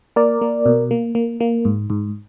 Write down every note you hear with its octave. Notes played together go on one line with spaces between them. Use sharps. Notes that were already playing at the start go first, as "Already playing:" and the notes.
A#3 A#4 D5
A#3
B2
A#3
A#3
A#3
G#2
G#2